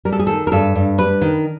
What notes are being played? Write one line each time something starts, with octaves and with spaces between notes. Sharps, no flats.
G3 A#4
A4
G#4
D#3 A4
A#4
G2 A4
G2
G3 B4
D#3